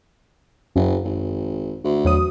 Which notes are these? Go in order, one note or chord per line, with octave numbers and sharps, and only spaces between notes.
F#1 F#2
G#1
D2
E2 F#3 D#6